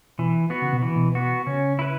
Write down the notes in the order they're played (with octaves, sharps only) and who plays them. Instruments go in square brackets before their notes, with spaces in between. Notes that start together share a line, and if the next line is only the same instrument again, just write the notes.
[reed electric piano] B2 [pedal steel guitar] E3
[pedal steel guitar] B3 F#4
[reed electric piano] C#3
B2
[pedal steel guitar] E3
[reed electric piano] B2
[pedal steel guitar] B3 F#4
[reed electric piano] C#3 [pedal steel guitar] C#4
[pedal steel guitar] E4 B4